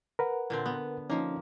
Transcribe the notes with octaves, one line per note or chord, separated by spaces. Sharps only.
A#4 B4 F#5
A#2 D3 C4
B3
F3 A#3 C#4 D#4